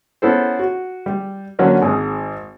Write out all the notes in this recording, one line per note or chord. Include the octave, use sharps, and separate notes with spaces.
B3 C#4 E4 A4 C5
F#4
G3
D3 F#3 A#3 C#4 D4
G#1 G#2 G#4